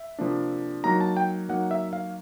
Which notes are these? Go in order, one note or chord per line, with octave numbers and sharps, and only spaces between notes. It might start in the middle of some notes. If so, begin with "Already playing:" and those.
Already playing: E5
C3 F3 A#3 D4
F#3 A#3 D#4 A#5
A5
G5
F#3 A#3 D#4 F#5
E5
F5